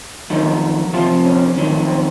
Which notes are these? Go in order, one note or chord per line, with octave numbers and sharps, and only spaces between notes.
F2 D#3 F#3 D#4
F2 C3 F3 F4
C#4
F2 D#3 F#3
C4